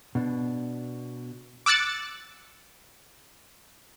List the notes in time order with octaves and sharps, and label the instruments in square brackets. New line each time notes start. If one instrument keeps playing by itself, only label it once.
[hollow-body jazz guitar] B2 D4
[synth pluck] D6 E6 F#6 A6 C#7